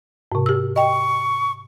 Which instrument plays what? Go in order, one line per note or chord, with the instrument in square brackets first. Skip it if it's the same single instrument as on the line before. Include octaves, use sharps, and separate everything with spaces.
[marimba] G#2 C3
G4 E6
[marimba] D#5 G5 [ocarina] C#6